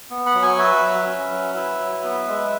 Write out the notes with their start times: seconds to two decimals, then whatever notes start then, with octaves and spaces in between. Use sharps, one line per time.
0.10 B3
0.26 F#5 B5
0.35 F#3
0.42 G#5 C#6
0.58 F#4 B4 E5
0.83 F#3
1.06 C#4
1.31 F#3
1.55 E4 B4 E5
1.79 F#3
2.04 B3
2.28 G#3